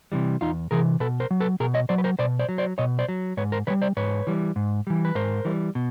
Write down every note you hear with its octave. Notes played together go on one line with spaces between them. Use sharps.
C3 E3 G3
E2 D#4 F4
C3 E3 G#4 A#4
B2 A4 B4
A#4 C5
F#3
A4 B4
B2 G#4 A#4
C#5 D#5
F#3 C5 D5
B4
A#4 C5
B2 C5 D5
C5 D5
F#3
C5 D5
B2 C#5 D#5
C5 D5
F#3
G#2 B4 C#5
A#4 C5
E3 G3 B4 C#5
C5 D5
G#2 B4 C#5
E3 G3
G#2
E3 G3
B4
G#2 A#4 C5
E3 G3
B2